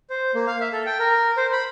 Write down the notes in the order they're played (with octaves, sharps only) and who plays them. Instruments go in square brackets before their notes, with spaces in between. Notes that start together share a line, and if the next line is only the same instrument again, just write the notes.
[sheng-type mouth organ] C5
A#3
F5
E5
A4
G5
A#4
C5
B5